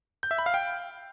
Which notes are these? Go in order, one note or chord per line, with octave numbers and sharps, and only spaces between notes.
G6
E5
B5
F5
G5